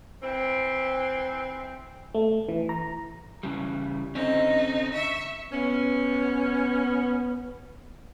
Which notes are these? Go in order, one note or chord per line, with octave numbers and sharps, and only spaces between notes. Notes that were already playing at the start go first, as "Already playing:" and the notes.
E3 C4
A3
E3
A#5
C#3 E3 G3
D3 C4 C#4 D#4
E5 C#6
B3 C#4